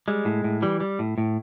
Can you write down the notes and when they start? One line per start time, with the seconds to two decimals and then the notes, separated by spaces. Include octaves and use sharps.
0.08 G3 G#3
0.25 A2
0.44 A2
0.62 E3 G3
0.80 G3
0.99 A2
1.18 A2